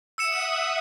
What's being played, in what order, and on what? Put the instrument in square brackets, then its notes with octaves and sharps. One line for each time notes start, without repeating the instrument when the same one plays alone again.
[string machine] E5 F#5 D#6 [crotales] E6 C#7 E7